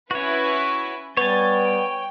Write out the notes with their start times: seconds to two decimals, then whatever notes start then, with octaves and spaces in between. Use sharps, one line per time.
0.11 C#4 E4 F#4 B4 C#5
1.17 G3 B3 C#5 G#5 G6 A6
1.56 G5